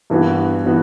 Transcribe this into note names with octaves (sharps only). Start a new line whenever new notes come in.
G2 E3 B3 F#4
E3 B3 F#4